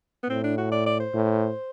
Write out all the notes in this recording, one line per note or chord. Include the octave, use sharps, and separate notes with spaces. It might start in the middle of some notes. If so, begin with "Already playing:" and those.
B3
A2 C4
D4
F#4
D5
D5
C5
A2